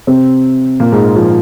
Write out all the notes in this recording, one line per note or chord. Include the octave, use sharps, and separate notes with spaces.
C3 C4
A#2 A#3
G#2 G#3
F3